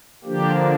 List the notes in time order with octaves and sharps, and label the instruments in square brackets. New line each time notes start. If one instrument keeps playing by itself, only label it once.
[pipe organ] D3 F3 A#3 D4 G4